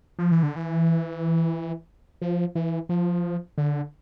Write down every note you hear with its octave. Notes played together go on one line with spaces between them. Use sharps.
F3
E3
D3
E3
F3
E3
F3
D3